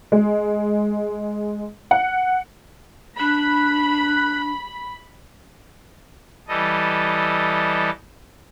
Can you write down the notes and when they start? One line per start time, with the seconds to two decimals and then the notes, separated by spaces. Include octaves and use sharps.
0.12 G#3
1.91 F#5
3.19 D4 B5 F#6
6.48 E3 G3 A4 D#5